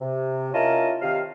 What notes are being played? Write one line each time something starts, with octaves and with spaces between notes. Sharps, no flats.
C3
C#4 E4 F4 A#4 D#5 A5
C3 D#3 F5